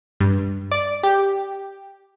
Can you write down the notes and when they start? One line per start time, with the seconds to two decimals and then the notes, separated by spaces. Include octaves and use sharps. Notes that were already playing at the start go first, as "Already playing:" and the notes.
0.20 G2
0.71 D5
1.03 G4